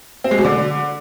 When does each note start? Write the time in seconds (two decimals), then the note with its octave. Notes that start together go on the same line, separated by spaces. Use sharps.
0.24 C4
0.31 G#3
0.38 B2
0.44 D3